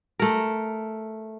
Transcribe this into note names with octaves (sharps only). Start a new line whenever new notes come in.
A3 A#4